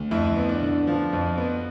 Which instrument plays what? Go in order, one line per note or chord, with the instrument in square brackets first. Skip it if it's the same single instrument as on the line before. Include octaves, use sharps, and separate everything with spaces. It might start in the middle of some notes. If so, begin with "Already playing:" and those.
Already playing: [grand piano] D2
F2 E4
B3
D4
D3
F3
F2
B3